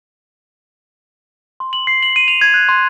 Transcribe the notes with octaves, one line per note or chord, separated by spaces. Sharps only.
C6
F#7
C7
F#7
D#7
F7
G#6
F#6
C6